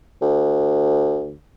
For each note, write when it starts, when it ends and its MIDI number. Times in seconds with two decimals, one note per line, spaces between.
0.22 1.37 38